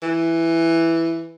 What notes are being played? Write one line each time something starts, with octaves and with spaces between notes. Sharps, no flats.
E3